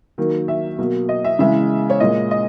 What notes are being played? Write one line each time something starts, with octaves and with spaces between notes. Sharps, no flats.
D#3 F#3 A#3
E5
B2 F#3 A#3
D#5
E5
C#3 E3 G#3 E5
C#5
A#2 G#3 D#5
D#5